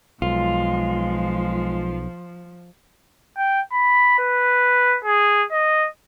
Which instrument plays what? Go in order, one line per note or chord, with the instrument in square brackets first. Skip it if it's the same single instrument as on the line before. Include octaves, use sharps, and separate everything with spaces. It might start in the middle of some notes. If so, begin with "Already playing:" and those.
[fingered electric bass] B1 [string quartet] F3 [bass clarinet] G#3 [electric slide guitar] F4
[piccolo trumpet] G5
B5
B4
G#4
D#5